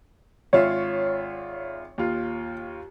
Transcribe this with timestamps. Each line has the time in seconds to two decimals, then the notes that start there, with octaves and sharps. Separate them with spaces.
0.53 G#1 F4 C#5 E5
1.98 D#2 F4